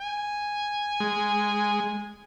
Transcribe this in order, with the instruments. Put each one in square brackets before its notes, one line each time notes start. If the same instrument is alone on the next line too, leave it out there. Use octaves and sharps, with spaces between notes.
[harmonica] G#5
[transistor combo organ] G#3